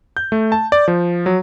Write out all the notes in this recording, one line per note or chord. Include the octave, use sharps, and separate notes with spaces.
G6
A3
A5
D5
F3
F#3